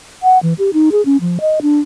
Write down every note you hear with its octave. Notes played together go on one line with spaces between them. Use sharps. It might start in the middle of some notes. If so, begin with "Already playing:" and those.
F#5
E3
G4
D#4
G#4
C#4
F3
D#5
D4